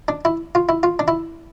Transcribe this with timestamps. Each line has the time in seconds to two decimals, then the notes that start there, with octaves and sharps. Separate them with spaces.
0.08 D4
0.25 E4
0.55 F4
0.69 E4
0.83 F4
0.99 D4
1.08 E4